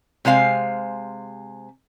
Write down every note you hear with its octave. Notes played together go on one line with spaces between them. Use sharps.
C3 G#3 C5 F5 G#5